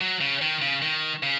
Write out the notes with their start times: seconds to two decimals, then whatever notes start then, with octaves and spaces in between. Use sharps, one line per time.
0.01 F#3
0.21 C#3
0.41 D#3
0.62 C#3
0.82 D#3
1.23 C#3